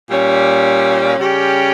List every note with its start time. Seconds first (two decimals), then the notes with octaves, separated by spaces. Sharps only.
0.08 A#2 G3 C#4
1.19 C#3 G3 C#4 G4